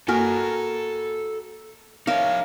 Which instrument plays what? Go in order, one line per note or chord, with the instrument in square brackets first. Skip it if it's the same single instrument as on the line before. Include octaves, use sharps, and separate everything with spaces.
[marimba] A#3 G#5 F6 [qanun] F#4 A#4 [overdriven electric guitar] A4 G5
[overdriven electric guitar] D#4 C#5 [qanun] A#4 E5 F5